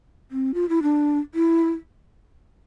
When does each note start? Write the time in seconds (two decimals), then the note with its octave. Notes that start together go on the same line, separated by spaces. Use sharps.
0.31 C4
0.54 F4
0.69 E4
0.82 D4
1.35 E4